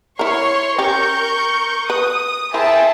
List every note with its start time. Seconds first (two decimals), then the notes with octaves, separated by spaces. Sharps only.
0.19 E4 A#4 C#5 C6 C#6
0.78 C#4 G4 A#4 C#6 G6
1.90 B4 D#6
2.54 E4 G#4 A#4 C5 E5 G5 A5